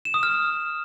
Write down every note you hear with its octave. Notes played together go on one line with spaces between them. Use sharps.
E7
D#6
F6